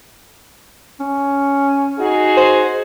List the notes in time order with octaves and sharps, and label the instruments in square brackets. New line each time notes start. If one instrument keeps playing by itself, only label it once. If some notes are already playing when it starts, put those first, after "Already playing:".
[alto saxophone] C#4
[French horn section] D#4 F#4 G#4
[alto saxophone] C5